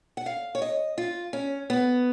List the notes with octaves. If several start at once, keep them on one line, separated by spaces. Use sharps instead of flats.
F#5
F5
C#5
D#5
F4
C#4
B3